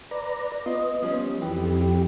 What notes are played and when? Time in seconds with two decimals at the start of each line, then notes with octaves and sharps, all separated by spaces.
0.11 B4 D5 A#5
0.66 B3 F4 D#5
1.02 F3 G3 C#4
1.42 F2 E3 G4